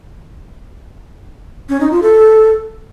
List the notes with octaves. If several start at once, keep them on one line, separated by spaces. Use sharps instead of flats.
C#4
D#4
F4
A4